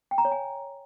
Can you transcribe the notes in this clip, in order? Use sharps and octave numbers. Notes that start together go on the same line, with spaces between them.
G5
A#5
C#5
G#5